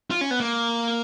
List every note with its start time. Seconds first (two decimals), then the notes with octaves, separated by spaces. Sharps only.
0.11 F4
0.21 C#4
0.31 B3
0.40 A#3